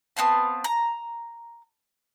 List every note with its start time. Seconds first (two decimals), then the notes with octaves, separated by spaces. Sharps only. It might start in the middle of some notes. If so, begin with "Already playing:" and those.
0.17 B3 C4 F5 A5
0.64 A#5